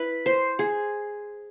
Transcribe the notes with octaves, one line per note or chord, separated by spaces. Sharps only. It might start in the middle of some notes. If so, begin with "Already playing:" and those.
Already playing: E4 B4
C5
G#4